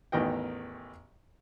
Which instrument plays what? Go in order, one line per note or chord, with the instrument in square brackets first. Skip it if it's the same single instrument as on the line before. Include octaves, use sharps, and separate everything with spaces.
[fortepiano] A1 E2 D#3 B3 D#5 G5